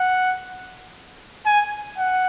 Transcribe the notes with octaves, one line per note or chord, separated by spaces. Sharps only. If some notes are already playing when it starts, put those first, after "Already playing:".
Already playing: F#5
G#5
F#5